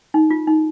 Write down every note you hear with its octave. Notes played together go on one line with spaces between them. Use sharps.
D#4
F4
D#4